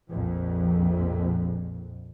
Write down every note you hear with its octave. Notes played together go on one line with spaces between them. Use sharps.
A#1 F2